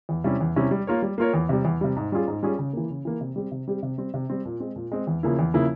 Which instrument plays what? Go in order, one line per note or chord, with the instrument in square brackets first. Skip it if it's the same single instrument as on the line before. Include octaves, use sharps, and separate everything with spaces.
[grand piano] E2
C3 G3 C#4 E4
E2
C3 G3 C#4 E4
G3
A#3 F4 A#4 C#5
G3
A#3 F4 A#4 C#5
E2
C3 G3
E2
C3 G3
G#2
G3 C#4 F4 G#4
G#2
G3 C#4 F4 G#4
C#3
E3 A#3
C#3
E3 A#3
C3
G3 C4 G4
C3
G3 C4 G4
C3
G3 C4
C3
G3 C4
A#2
G#3 C4
A#2
G#3 C4
E2
C#3 F3 A#3 E4
E2
C#3 F3 A#3 E4